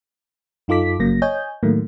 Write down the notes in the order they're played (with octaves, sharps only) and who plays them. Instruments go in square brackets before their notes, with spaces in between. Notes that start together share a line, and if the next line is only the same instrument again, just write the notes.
[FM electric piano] F#2 D#4 F4 A4 D6 B6
G1 C#3 F#3 A#3 A#6
C#5 D#5 G#5 G6
A2 D#3 F#3 A3 A#3